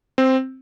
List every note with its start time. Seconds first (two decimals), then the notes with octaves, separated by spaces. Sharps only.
0.18 C4